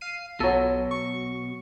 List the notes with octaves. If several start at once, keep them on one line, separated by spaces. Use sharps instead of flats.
F5 C7 D#7
B1 B2 F#3 A4
C#6